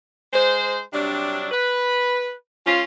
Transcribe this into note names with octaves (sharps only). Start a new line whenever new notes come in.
G#3 C5
C3 F#3 G3 D4
B4
G#3 C#4 F4